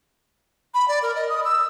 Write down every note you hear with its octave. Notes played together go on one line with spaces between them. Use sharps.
B5
D5
A#4
D#5
D#6
E6